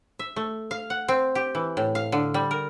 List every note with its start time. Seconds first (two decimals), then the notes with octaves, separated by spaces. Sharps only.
0.19 E5
0.36 A3
0.71 F5
0.90 F#5
1.08 C4
1.35 G4
1.55 E3
1.77 A2
1.95 F5
2.12 D3
2.34 G3
2.51 A#4